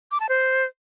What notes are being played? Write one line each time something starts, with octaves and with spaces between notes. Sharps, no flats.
D6
A5
C5